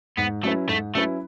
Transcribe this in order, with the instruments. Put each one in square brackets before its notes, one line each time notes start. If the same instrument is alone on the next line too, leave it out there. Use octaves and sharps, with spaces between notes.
[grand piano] G#2 [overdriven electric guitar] B3
[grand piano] F#3 C#4 E4 B4 [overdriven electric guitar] A3
[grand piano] G#2 [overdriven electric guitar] A3
[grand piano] F#3 C#4 E4 B4 [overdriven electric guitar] A3